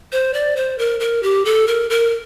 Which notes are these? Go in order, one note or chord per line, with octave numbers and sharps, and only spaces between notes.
C5
D5
C5
A#4
A#4
G4
A4
A#4
A#4